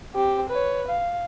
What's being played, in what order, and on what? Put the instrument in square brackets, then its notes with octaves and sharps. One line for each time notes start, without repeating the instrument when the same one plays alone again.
[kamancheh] C4 G4
B4 C#5
F5